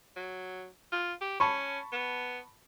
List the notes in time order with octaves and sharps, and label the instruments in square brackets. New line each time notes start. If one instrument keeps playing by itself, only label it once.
[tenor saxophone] F#3
F4
G4
[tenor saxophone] C#4 [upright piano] A5 B5 C#6
[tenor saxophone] B3